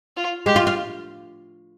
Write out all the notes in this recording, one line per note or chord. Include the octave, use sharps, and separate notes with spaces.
F4
G#3 G4
F4
F4